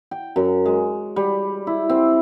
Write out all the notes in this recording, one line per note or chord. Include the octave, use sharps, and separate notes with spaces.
G5
F#2
G#3
G3
E4
C4